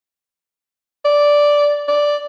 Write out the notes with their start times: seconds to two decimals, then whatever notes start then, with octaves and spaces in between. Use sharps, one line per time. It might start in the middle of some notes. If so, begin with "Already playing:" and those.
1.05 D5
1.88 D5